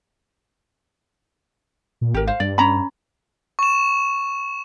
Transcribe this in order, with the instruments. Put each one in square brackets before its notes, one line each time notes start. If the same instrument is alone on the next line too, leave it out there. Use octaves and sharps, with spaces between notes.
[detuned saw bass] A#2
[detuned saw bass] G#1 [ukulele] G4 A#4
[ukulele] C5 F5
[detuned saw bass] G2 [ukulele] D5
[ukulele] C#4 A#5 B5
[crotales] C#6 E7